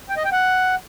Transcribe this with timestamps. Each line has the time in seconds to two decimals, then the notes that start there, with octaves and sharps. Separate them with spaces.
0.09 G5
0.17 D#5
0.24 G5
0.32 F#5